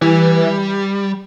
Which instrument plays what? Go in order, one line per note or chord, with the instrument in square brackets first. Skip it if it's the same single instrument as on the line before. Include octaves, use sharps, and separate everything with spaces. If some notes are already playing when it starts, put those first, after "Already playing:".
[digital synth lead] E3 [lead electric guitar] G3